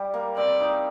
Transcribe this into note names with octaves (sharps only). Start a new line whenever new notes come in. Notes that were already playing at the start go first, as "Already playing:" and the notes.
Already playing: G3
A#3
C4 D5
D#4